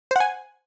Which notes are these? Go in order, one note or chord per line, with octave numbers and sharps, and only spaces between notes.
C5 F#5 G#5